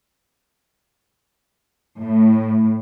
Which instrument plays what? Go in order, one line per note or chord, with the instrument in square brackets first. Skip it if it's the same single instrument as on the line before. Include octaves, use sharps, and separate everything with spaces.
[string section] A2